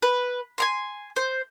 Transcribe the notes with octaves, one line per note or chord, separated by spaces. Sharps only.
B4
G#5 A#5 C6
C5